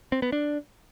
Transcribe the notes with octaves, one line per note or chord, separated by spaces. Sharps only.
C4
B3
D4